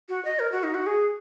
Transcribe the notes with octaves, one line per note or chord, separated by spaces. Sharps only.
F#4
D#5
A#4
F#4
D#4
F#4
G#4